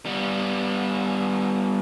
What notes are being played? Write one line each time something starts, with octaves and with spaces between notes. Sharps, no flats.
G3 B3